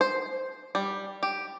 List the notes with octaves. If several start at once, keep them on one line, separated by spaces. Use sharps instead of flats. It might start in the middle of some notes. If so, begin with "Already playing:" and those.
C5
G3
G4